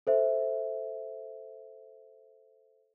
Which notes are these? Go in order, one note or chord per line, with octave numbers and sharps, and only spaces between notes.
A4 C5 E5